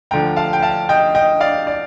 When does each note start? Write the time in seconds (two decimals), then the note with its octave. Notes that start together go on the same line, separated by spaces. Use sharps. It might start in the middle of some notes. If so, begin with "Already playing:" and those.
0.11 D2 D3 F3 G5 A#5
0.36 F5 A5
0.53 G5
0.62 F5 A5
0.89 D#5 G5
1.15 D#5 G5
1.41 D5 F5
1.67 D5